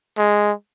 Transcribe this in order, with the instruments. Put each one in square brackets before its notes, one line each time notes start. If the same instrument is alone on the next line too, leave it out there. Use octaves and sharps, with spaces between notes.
[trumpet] G#3